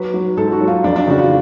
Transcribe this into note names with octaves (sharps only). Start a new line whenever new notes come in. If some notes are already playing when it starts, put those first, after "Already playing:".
Already playing: F#3 B4
F#3
G#2 A4
F#4
F#3
F4
F2 D4
D4
C#3 F#4
F4